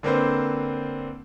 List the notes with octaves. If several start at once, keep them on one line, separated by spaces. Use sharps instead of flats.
D3 A#3 C4 B4 C5